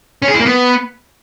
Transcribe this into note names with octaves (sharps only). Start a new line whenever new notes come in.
C#4
G#4
E4
A#3
B3